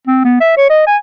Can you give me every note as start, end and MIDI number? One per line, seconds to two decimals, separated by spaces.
0.07 0.21 60
0.25 0.36 59
0.40 0.57 76
0.57 0.68 73
0.70 0.84 75
0.87 0.97 80